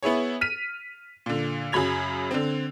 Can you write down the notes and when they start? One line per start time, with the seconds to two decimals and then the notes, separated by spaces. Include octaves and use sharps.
0.03 B3 E4 G#4 C#5
0.41 F6 B6 D#7
1.26 A#2 D3
1.72 F#2 C#3 F#3 B5 G#6 F7
2.31 D3 C4